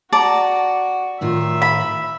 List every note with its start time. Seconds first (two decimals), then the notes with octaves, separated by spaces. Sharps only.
0.12 F#4 D5 A5 A#5
1.21 A2 D#3 F4 E5
1.62 B5